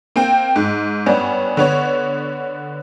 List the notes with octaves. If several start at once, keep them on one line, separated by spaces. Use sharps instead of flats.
A#3 C4 G5
G#2
G2 B3 C#4 D4
D3 B3 C#5